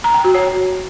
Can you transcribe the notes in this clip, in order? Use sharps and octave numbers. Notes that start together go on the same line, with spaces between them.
A#5
G5
F#4
C#5